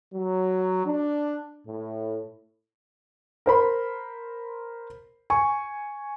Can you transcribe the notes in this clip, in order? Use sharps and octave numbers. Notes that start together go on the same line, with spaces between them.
F#3
D4
A2
A#4 C5 B5 C6
G#5 C#6